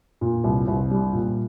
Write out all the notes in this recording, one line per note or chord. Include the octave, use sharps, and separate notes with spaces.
A#2
C2
C2
G3
A#2